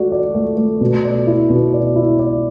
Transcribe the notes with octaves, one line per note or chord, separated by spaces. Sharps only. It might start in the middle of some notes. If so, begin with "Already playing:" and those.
Already playing: A3 F#4 D5
D5
A3
A3
B2
D5
E4
B2
D5
E4
D5